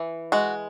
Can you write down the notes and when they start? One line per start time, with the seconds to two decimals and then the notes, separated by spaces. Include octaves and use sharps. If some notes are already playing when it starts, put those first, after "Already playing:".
Already playing: E3
0.32 G#3 F#4